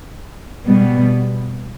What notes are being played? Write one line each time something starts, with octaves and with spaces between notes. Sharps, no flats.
B2 G3 B3